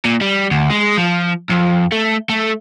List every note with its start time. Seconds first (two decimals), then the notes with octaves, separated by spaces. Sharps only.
0.05 A#2
0.21 G3
0.51 D2
0.70 G#3
0.97 F3
1.51 F2
1.92 A3
2.29 A3